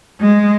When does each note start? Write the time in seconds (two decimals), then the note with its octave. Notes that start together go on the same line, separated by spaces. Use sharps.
0.21 G#3